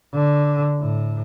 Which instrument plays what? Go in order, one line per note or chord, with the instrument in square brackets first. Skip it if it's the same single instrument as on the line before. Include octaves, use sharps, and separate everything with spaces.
[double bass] D3
A2